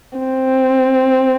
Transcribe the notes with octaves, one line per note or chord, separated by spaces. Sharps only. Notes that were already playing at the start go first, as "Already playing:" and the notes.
C4